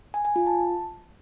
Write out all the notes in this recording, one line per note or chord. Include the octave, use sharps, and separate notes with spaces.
G#5
G#5
F4
A5